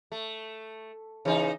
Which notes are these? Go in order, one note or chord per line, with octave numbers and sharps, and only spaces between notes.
A3
C#3 E3 D#4